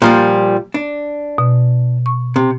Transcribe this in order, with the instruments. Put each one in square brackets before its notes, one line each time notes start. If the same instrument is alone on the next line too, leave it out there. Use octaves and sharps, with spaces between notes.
[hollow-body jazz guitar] A#2 F3 G3
D4
[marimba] B2
C#6
[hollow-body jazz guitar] C3